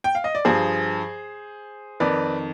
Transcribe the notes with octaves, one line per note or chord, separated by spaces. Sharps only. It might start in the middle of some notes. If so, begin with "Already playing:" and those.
G5
F5
D#5
D5
G2 F3 G#4 C5
F2 D#3 B4 D5